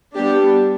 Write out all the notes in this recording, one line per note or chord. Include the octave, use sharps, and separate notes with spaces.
G3 B3 D4 G4